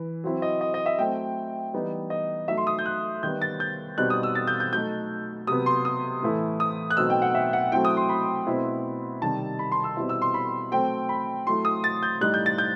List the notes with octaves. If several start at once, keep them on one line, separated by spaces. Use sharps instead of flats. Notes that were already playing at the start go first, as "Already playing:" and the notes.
Already playing: E3
F#3 C4 E4
D#5
D#5
D#5
E5
F#3 A3 C4 G5
E3 G3 B3 D#4
D#5
F#3 A3 D#4 E5
C6
D#6
G6
F#6
D#3 G3 B3 G6
A6
G6
B2 G3 C4 D#4 F#6
D#6
E6
A6
G6
G6
F#3 A3 D#4 G6
C3 F#3 B3 D#6
C6
D#6
A2 E3 A3 E4
D#6
F#6
B2 F#3 A3 C4 D#4 E6
G5
F#5
E5
F#5
F#3 A3 C4 E4 G5
D#6
C6
B5
B2 A3 C4 E4
C3 D#3 G3 D#4 A5
B5
C6
E6
B2 G3 C4 E4
E6
C6
B5
F#3 A3 C4 G5
B5
F#3 A3 E4 C6
D#6
A6
G6
A2 G3 D#4 F#6
G6
A6
G6